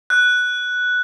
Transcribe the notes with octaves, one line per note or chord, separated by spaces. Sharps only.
F#6